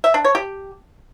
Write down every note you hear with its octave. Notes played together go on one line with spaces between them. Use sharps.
E5
D4
C#5
G4